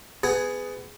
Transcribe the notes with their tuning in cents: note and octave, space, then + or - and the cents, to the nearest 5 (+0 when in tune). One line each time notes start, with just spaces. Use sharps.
B3 +20 G#4 +0